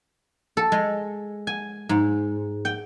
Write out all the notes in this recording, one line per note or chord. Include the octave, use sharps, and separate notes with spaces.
A4
G#3
G#5
G#2
G5